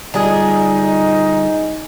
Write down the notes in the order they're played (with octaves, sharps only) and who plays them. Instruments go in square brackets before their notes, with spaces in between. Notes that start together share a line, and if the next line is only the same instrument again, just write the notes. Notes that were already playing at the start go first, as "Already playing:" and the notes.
[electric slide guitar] D3 G3 F4 [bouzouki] D4 G#4 [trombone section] D#4